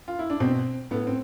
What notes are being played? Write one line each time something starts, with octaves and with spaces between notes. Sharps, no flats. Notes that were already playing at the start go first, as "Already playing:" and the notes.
F4
E4
D4
B2 C4
A2 B3
C4